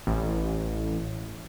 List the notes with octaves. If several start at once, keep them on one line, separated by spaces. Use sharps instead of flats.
A1